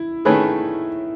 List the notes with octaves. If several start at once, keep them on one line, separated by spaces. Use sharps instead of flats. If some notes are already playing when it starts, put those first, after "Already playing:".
Already playing: E4
D#3 A3 C#4 G#4 B4